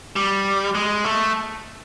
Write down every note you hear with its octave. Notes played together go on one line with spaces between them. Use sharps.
G3
G#3
A3